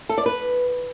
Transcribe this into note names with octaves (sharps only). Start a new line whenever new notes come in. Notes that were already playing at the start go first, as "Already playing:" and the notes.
A4
D5
B4